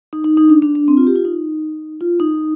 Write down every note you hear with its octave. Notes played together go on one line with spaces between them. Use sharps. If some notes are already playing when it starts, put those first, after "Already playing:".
D#4
D#4
D#4
D4
D4
D4
C4
F4
G4
F4
D#4
F4
D#4